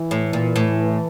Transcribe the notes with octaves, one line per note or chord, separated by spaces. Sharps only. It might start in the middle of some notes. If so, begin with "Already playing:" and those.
Already playing: E3
A2
A#2
A2